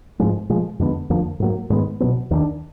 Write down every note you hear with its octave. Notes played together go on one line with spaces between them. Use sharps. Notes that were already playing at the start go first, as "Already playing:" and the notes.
G#2 F3 G#3
A#2 F3 G#3
F2 D3 G#3 B3
F2 D3 F3 A#3
G#2 F#3 A#3
G#2 D#3 G#3 B3
B2 F#3 B3
D#2 D#3 F#3 D4